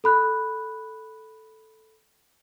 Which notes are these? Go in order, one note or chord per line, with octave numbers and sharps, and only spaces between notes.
A4 B5 F#6